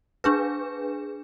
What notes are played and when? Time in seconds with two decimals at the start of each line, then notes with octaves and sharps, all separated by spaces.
0.24 D4 G#4 B4